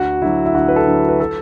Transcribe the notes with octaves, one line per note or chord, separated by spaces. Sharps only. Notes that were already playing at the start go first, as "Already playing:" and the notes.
Already playing: D2 F#4
D3 F#3 E4
E4
D2 F#4
B4
A4
D3 F#3
B4
A4